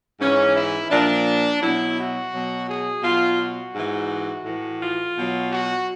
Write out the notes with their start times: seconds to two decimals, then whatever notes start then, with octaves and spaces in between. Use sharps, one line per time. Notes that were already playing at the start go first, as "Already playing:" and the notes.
0.20 G#2 E3 C#4
0.55 E4
0.90 A#2 F3 D4
1.62 B2 F#3 E4
1.98 F#4
2.33 B2 F#3
2.68 G#4
3.03 B2 F#3 F4
3.40 F#4
3.74 G#2 E3
4.45 A2 E3
4.80 F4
5.17 B2 F#3
5.52 F#4